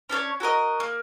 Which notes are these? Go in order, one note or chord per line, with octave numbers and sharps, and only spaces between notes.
C#4 D4 A4 C#5
F#4 A4 A#4 D#5
A#3